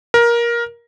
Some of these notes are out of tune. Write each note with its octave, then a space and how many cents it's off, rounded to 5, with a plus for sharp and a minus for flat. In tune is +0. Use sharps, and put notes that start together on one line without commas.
A#4 +15